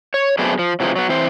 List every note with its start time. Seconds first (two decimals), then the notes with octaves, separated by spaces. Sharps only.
0.14 C#5
0.39 F#3 A3 B3 C4 D4 G#4
0.59 F3
0.80 C3 E3 F3 G#3
0.96 F#3 B3
1.09 E3 C4 C5